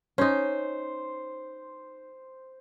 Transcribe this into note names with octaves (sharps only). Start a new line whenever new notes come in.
C#4 D#4 C5